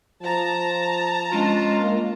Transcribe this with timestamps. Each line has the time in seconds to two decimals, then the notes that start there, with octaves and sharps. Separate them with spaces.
0.22 F3 A5 A#5
1.32 G#3 C#4 D4 F4
1.79 A#3